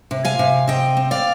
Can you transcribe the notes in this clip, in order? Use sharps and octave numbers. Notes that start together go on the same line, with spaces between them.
C3
F5 G#5
C3
C4 D#5 G5
C4
D5 F5